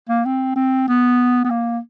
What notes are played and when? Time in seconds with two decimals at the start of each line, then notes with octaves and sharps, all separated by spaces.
0.09 A#3
0.25 C4
0.56 C4
0.88 B3
1.45 B3
1.50 A#3